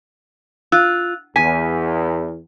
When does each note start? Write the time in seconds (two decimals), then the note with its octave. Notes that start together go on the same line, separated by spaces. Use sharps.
0.72 F4 E6 F#6
1.36 E2 G#5 B6